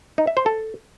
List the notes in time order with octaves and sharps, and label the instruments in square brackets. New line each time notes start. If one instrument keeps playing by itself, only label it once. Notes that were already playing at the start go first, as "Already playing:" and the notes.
[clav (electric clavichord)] D#4
E5
C5
A4